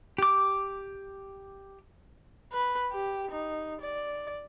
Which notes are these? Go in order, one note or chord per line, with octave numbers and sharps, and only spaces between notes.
G4 D6
B4
G4
D#4
D5